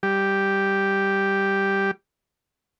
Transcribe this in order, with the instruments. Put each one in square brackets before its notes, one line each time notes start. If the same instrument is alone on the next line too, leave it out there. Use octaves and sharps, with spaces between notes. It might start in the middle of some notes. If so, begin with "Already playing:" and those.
[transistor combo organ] G3 G4